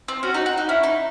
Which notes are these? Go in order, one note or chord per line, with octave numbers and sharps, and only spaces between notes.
C4
C#4 F#4
D#4
F#4
D#4
C#4 E4
D#4